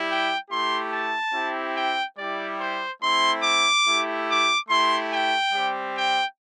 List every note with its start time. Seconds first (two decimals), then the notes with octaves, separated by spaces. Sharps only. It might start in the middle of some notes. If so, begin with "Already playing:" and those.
Already playing: G3 E4 G4
0.09 G5
0.50 A3 E4 G4 C6
0.93 A5
1.34 C4 E4 G4
1.75 G5
2.17 G3 E4 G4 D5
2.59 C5
3.01 A3 C4 E4 C6
3.43 D6
3.86 A3 E4 G4
4.28 D6
4.69 A3 E4 G4 C6
5.12 G5
5.53 G3 C4 G4
5.96 G5